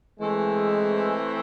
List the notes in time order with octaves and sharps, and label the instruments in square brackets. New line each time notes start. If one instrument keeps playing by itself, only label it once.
[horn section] E3 A3 C4 [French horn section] G#3